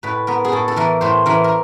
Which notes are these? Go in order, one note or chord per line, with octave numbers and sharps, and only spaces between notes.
A2 B4
B3 A#4
G#4
A2 A4
A4
E3 A#4
A2 C5
E3 A#4
A#4